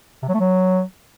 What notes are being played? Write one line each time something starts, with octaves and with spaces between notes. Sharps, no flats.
C3
F#3
A3
F#3